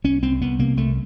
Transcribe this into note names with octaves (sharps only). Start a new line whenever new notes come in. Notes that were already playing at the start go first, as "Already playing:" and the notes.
C2 C#4
C2 C4
C2 B3
C3 A#3
C2 A3